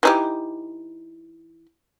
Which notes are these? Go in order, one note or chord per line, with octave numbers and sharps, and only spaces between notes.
E3 D#4 G4